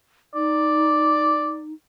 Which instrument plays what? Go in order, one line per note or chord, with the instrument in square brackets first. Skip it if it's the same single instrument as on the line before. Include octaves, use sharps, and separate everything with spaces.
[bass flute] D#4 [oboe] D5